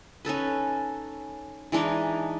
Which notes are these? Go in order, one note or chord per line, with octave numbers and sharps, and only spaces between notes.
C#4 D#4 A4 B4
E3 G#3 D4 D#4